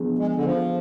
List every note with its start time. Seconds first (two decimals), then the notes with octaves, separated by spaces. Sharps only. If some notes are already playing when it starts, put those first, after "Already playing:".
Already playing: F3 B3 D4 G#4
0.18 G#3
0.36 D3
0.45 F3